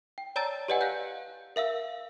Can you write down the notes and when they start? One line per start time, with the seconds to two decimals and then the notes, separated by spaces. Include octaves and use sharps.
0.18 G5
0.36 C#5 D5 A5 A#5 E6 A6
0.68 G4 B4 D5 D#5 F#5 G#5
0.81 F5 F#6 G6
1.56 A#4 E5 F5 E6